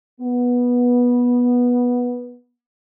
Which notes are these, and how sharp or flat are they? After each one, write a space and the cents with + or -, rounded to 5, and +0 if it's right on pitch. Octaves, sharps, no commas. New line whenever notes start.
B3 -15